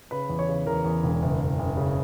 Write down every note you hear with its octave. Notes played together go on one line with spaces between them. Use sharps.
C#3 B4
E2
C#5
C#3
E2 A#4
E2
E1
F#1
F#1
F#1
C#3